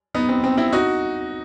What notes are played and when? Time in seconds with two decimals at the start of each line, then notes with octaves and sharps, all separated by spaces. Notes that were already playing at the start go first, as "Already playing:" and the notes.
0.14 B3 D#4
0.29 C4
0.44 C4
0.58 C4 E4
0.73 D#4 F#4